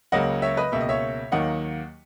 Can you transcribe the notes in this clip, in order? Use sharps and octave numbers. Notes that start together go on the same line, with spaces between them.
C#2 C#3 F#3 A#3 D#5 F#5
C#5 E5
B4 D#5
C#2 B2 A#3 E5
D#5
C#5 E5
D#2 D#3 F#3 A#3 D#5 F#5